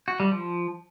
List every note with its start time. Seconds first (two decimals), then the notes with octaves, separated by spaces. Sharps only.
0.08 F#4
0.20 G3
0.32 F3